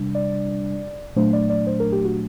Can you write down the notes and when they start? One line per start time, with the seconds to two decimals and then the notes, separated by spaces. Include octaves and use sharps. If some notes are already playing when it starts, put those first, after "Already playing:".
Already playing: C3 G3 D4
0.15 D5
1.16 A#2 F#3 A3 D4 C5
1.33 D5
1.50 D5
1.67 C5
1.80 A#4
1.92 G4
2.05 F#4